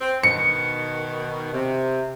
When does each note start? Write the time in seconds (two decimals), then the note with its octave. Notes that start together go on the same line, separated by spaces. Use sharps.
0.01 C4
0.23 B2 D#3 C#7
1.53 C3